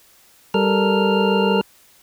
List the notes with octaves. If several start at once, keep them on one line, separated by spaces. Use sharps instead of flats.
G3 A4 A#4 F6